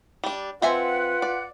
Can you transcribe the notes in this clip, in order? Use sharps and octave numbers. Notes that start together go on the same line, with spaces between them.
G3 D4
C4 F4 B4 E5 F#5 G#5
D5